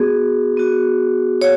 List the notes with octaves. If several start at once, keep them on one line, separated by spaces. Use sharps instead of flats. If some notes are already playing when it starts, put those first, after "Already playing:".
Already playing: B3 F#4 G#4
B3 F#4
C#5